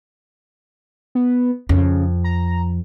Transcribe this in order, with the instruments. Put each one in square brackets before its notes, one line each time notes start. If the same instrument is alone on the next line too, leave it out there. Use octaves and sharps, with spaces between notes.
[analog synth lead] B3
[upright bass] F2 [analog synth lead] C#3
[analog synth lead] A#5